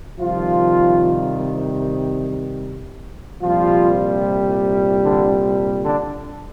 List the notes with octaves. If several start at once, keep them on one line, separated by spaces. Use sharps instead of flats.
C2 C3 D#3 F3 G3 F4
C2 A#2 F3 G3 F4
D3 D4
D3 D4